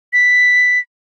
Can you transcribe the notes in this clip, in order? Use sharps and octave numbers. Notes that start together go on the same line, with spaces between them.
B6